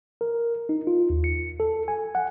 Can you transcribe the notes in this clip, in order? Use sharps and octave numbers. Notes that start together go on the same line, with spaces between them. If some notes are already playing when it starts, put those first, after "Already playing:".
A#4
D#4
F4
D#2
C#7
A4
G#5
F#5